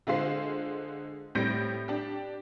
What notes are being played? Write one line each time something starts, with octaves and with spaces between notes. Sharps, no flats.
D3 G#3 F4 C5 C7
A2 G3 C4 G6 A#6 D7
D4 G4